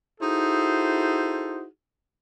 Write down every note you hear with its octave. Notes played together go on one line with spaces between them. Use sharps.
D#4 E4 F#4 G#4 A4 C5